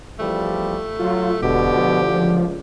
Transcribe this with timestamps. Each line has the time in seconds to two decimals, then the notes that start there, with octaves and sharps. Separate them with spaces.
0.19 E2 F3 G3 A3
0.99 F#3 F4
1.42 E1 D2 B2 D3 G4
1.76 F3
2.15 C#2